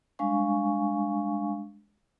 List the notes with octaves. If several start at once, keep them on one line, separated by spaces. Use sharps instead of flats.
G3 G#3 D4 F5 G#5 C#6